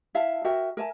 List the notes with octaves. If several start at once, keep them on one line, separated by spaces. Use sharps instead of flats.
E4 E5 F5 A5
F#4 A#4 E5 G5
A#4 E5 G#5 A5